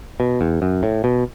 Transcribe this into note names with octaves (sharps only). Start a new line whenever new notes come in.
B2
E2
F#2
A2
B2